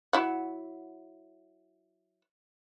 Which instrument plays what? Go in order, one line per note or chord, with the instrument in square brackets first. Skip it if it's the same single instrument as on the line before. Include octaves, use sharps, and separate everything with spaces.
[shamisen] F#3 E4 F#5